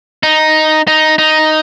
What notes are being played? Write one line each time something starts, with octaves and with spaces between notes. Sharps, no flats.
D#4
D#4
D#4